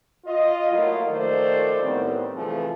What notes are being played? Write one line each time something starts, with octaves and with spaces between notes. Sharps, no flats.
F4 D#5
F#3 A3 A#3 E4 F4
D#3 F3 A3 C5 D5
A2 D#3 G3 B3 C4
C3 E3 F3 A3 F4 G#4